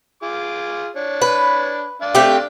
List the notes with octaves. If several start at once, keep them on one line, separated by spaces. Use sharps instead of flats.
F4 G#4 D6
D4 C#5
B4
D4 D5 F5
A3 C4 G4